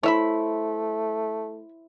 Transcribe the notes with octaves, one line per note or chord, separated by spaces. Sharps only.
A3 E4 C5 C#5 E5 B5